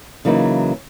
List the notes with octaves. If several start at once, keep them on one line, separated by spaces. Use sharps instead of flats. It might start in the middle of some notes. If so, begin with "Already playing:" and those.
C#3 E3 F#3 A#3 D#4